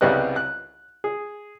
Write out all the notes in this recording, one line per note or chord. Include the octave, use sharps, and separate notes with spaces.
C2 C#3 G3 B3 D#5 F#6
F#6
G#4